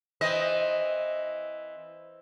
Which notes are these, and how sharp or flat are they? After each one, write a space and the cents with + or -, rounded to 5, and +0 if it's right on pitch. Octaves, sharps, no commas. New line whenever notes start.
E3 +0 C4 +5 D#5 +0